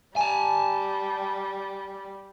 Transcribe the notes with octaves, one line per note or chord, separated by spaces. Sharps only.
G3 G#5 A5